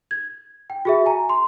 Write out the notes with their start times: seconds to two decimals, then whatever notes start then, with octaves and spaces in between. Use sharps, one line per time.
0.11 G#6
0.70 G5
0.85 F#4 G#4 E5
1.06 G#5 A#5
1.29 C6